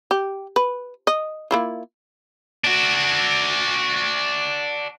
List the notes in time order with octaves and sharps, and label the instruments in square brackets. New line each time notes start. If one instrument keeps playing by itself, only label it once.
[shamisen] G4
B4
D#5
A#3 E4 F4
[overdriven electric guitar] D4 F#4